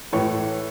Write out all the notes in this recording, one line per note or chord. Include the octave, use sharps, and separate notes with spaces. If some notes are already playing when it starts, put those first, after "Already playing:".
A2 E3 C#5 C#6